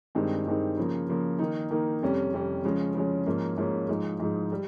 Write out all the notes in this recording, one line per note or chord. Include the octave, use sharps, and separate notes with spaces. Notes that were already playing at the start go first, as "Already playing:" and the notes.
G2 D#3 G#3 C4 D#4
G2 D#3 G#3 C4 D#4
C#3 F3 A#3
C#3 F3 A#3
D#3 A#3 D#4
D#3 A#3 D#4
F2 C3 G3 C#4
F2 C3 G3 C#4
C#3 F3 G#3 C#4
C#3 F3 G#3 C#4
G#2 F3 A#3 C#4
G#2 F3 A#3 C#4
G#2 F3 G#3 D#4
G#2 F3 G#3 D#4
G3